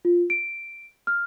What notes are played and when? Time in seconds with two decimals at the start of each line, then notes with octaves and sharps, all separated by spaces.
0.05 F4
0.30 D7
1.07 F6